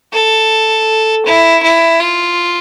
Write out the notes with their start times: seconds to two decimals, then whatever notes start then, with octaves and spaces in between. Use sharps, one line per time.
0.13 A4
1.26 E4
1.63 E4
2.00 F4